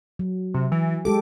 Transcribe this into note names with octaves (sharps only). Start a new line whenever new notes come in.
F#3
C3
E3
G#3 G4 A4 D6